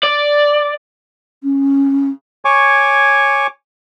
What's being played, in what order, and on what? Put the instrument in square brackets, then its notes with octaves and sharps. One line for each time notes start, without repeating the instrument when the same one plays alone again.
[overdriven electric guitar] D5
[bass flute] C#4
[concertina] C#5 G#5 C#6 D6